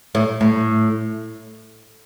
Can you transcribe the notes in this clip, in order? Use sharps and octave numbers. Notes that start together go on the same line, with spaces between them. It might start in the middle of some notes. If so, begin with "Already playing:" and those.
A2
A2